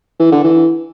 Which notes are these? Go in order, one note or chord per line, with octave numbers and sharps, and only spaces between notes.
E3
D3
E3